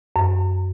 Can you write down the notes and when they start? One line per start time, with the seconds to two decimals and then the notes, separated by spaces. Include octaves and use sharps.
0.16 F#2